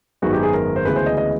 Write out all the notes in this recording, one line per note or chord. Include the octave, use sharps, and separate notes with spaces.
G#1 F#2 D#3 G#3 B3 F#4
G4
G#4
A#4
C5
D2 C#3 E3 G#3 B3 B4
C5
D#5
D#5